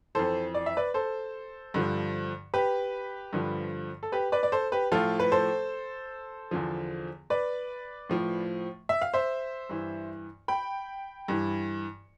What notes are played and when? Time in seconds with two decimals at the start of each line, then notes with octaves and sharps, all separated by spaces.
0.15 F2 E3 A4 C5
0.54 D5
0.66 E5
0.77 B4 D5
0.94 A4 C5
1.74 G2 D3 F3
2.54 G4 B4
3.33 G2 D3 F3
4.03 A4
4.12 G4 B4
4.32 B4 D5
4.43 D5
4.52 A4 C5
4.72 G4 B4
4.92 A2 F3 F4 A4
5.20 B4
5.32 A4 C5
6.51 E2 D3 F3
7.30 B4 D5
8.09 A2 F3
8.89 E5
9.02 F5
9.13 C5 E5
9.69 G2 E3
10.48 G5 B5
11.28 G2 E3